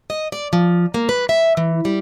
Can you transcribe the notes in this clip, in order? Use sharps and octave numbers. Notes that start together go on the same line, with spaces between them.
D#5
D5
F3
A#3
B4
E5
E3
G3